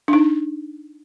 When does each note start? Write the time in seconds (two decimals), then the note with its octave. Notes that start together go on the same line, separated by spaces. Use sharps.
0.08 D4
0.13 D#4